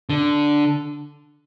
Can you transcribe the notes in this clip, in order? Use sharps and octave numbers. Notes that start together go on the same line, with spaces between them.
D3